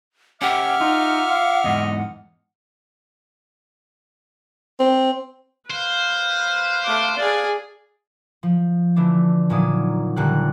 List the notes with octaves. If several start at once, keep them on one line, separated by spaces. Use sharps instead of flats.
C#4 G4 E5 F#5 D6 F6
D#4 F4
F5
E2 G#2 D#5
C4
B4 C5 F5
A3 D6
G#4 D5
F3
D3 E3 A3 D4
D#1 A#2 D#3 F#3 D5 D#6
D#1 D3 G3 A#3 G4 F#6